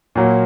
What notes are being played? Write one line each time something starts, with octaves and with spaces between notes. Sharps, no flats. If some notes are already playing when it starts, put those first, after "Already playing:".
A#2 F#3 A#3